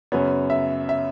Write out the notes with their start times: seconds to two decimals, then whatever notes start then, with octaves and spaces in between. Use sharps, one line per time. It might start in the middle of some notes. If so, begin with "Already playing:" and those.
0.12 F#2 C#3 F#3 B3 C#5
0.50 E5
0.89 E5